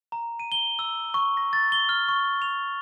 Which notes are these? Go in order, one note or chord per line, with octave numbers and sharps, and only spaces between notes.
A#5
D#7
G7
E6
C#6
A#6
A6
G7
F6
C#6
F7